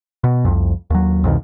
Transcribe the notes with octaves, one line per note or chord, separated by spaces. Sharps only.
B2
C2 F2
D#2 F#3
C2 F2 B2 D#3